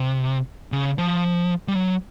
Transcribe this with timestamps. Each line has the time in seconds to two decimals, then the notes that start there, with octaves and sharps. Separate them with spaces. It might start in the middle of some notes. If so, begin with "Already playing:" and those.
Already playing: C3
0.72 C#3
0.98 F3
1.68 G3
1.75 F#3